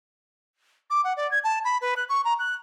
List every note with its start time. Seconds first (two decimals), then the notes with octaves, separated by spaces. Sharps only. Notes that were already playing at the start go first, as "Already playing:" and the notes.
0.90 D6
1.04 F#5
1.17 D5
1.31 G#6
1.44 A5
1.65 B5
1.81 B4
1.96 F#6
2.09 C#6
2.25 A#5
2.39 F#6